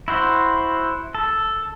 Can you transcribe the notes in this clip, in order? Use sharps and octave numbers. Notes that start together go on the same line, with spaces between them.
E4 F#4 C5
A4